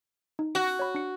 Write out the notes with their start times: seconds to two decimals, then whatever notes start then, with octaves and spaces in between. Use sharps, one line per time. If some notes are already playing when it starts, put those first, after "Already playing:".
0.39 D#4
0.55 F#4
0.79 C#5 B5
0.95 D4 C#7